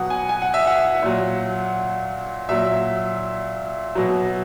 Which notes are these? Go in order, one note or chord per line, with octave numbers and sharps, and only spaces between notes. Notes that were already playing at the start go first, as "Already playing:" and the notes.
Already playing: B2 F#3 F#5 D#6
G#5
G#5
F#5
E5
F#5
A#2 F#3
A#2 F#3 E5
B2 F#3